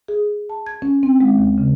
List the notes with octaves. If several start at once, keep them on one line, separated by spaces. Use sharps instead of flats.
G#4
A5
G#6
C#4
C4
G#3
D#2
C#3